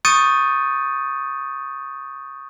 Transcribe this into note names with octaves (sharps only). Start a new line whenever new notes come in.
C#6 D#6 G6 A6 C#7 D#7